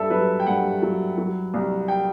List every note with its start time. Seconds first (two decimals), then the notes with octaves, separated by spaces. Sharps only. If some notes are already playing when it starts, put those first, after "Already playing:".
Already playing: G2 A4 E5
0.10 F#3 B4
0.40 G5
0.47 G2 F#5
0.82 F#3
1.18 F#3
1.54 C2
1.88 G5